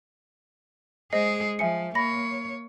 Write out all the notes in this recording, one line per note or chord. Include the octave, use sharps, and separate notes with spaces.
G#3 G#4 C5 D#5 C7
F3 E5 G#5 C#7
A#3 C#5 B5 A#6